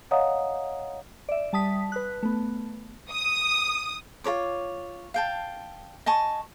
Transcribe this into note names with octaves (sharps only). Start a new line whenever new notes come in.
C#5 D#5 F5 F#5 A#5 D#6
D5 E5
G3 A5 D#6 B6
B4 F#6
A3 B3
D#6
F4 A#4 C#5 D6
F5 G5 A5
D#5 G#5 A5 C#6